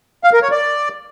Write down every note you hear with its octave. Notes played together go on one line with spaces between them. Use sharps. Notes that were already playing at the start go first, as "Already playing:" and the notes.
F5
A#4
C#5
D5